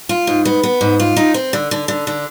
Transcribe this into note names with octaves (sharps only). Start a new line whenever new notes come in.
F4
G#2
B3
B3
G#2
F4
D#4
C4
D3
D3
D3
D3